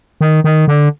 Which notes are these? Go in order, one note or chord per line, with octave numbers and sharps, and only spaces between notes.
D#3
D#3
D3